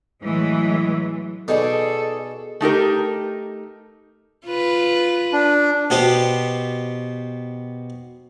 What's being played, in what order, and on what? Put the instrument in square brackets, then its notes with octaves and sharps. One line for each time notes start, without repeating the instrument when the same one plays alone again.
[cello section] A2 E3 F#3 G#3
[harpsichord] B2 [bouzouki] D#4 G#4 D5 [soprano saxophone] A4
[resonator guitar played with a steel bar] A3 D#4 G4 A#4
[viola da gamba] F4 B4
[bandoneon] D4
[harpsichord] B2 B3 G4 C5